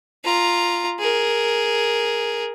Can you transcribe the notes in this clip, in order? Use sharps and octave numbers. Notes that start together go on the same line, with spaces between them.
F4 A#5
G#4 A#4